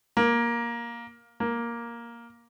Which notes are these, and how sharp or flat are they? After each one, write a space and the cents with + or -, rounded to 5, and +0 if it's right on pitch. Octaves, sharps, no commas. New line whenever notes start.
A#3 +10
A#3 +5